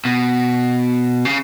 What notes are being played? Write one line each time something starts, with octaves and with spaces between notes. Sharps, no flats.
B2
C#3